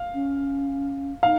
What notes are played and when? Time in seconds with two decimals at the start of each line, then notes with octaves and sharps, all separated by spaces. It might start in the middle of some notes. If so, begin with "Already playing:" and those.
Already playing: F5
0.14 C#4
1.23 D#4 F5